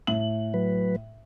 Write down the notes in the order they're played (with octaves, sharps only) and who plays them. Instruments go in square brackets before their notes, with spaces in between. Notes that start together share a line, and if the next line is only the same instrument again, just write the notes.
[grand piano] A2 F#7
[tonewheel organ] F#3 B4